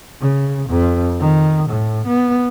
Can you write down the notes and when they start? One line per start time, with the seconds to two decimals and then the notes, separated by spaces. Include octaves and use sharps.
0.21 C#3
0.70 F2
1.20 D#3
1.70 A2
2.07 B3